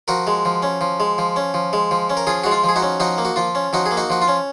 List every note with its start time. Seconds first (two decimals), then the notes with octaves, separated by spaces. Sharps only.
0.08 F3 F#4 A#4
0.27 G#3
0.45 F3
0.63 C#4
0.81 F3
1.00 G#3
1.18 F3
1.36 C#4
1.54 F3
1.73 G#3
1.91 F3
2.10 C#4
2.17 A#4
2.27 F3 F4 G#4
2.44 G#3 F#4
2.51 F4
2.64 F3 G#4
2.76 D#4 F#4
2.82 C#4
3.00 F3 D#4 F#4
3.18 A#3
3.25 F#4
3.36 F3 F4
3.55 C#4
3.73 F3 D#4 F#4
3.86 G#4
3.91 A#3
3.97 D#4 F#4
4.10 F3 F#4
4.22 F4
4.28 C#4